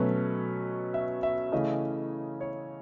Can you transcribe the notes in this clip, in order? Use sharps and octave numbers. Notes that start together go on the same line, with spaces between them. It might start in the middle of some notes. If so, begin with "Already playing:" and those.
Already playing: B2 F#3 A3 C#4 B4
E5
E5
C#3 E3 A3 C#4 D#5
C#5